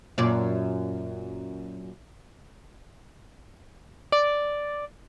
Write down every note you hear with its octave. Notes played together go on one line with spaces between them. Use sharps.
F#2 A#2 D5
D5